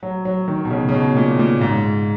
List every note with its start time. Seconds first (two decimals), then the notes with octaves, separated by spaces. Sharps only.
0.03 F#3
0.25 F#3
0.48 D#3
0.65 B2
0.70 C#3
0.89 C#3
0.94 B2
1.16 A#2
1.39 A#2
1.61 G#2